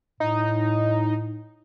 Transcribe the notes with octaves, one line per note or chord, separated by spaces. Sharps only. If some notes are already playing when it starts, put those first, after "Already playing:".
A2 D#4